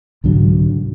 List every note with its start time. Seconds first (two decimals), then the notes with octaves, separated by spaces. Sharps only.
0.24 C2 G#2 D3 F#3